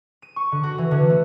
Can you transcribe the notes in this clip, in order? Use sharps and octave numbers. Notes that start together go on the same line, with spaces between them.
D#7
C#6
D3
F#4
E3
D3
A3